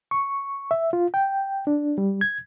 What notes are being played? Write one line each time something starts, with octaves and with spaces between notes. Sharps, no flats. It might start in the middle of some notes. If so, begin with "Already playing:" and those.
C#6
E5
F4
G5
D4
G3
G#6